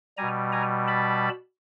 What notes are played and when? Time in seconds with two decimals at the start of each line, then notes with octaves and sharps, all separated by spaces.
0.17 B2 G3 G#5 A#5
0.52 G#5 A#5
0.87 A5 B5